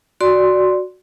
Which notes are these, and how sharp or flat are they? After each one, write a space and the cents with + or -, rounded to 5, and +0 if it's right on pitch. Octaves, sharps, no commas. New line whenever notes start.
F#4 +0 D5 +0 C6 +0